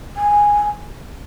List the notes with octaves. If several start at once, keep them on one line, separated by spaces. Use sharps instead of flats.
G#5